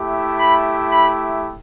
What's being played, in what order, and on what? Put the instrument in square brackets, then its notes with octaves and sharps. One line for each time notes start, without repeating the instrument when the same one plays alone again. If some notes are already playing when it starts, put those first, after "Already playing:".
Already playing: [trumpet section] A3 E4 G4
B5
B5